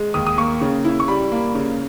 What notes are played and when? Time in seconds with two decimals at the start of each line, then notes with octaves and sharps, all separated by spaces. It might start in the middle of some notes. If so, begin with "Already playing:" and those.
Already playing: G#3
0.14 D#2 D#6
0.27 D#6
0.38 A#3 C#6
0.61 C#3
0.85 E4
1.00 C#6
1.08 G3 B5
1.32 A#3
1.55 C#3